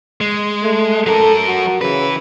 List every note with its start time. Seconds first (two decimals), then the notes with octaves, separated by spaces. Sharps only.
0.21 G#3
0.63 A3
1.06 F#3 A4 A#4
1.47 F#4
1.81 C#3 E3 B4